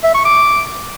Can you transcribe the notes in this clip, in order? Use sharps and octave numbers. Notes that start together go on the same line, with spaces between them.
E5
C#6
D6